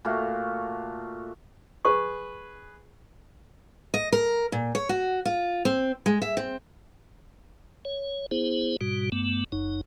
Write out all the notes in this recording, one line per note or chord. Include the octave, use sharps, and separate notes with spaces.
A#2 A3 F#4 F5
G#4 B4 C#6
D#5
A#4
A#2
C#5
F#4
F4
C4
G#3
E5
C4
C#5
B3 E4 G#4 C5
G#2 B2 G3 F#4
G2 A3 B3
F#1 F#2 D#4